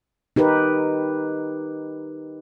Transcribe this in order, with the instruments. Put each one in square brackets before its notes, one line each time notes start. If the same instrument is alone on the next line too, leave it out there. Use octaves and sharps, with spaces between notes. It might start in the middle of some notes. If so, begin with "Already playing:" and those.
[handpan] D#4 G4 A#4 B4